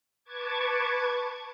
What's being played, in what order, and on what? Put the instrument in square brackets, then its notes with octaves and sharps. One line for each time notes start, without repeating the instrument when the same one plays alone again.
[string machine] B4 A5 C#6 D6 G#6